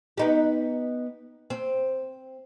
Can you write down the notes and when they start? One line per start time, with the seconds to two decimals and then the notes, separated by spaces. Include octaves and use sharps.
0.17 B3 D#4 G4
1.50 C4